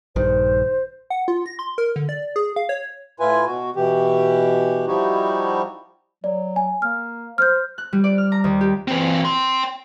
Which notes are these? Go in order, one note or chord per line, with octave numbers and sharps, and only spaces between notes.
A#1 G2 D#3 C5
F#5
F4
A#6
C6
A#4
D3
D5
G#4
F5
C#5
A2 E4 F4 B4 G#5
B2 F#4
B2 E3 G4
F3 G3 D#4 E4 F#4 G4
F#3 D5
G#5
A#3 F6
C5 F6 G6
F#6
G3
D5
F6
A#5
D#2
G4
E3 C4
G5 C6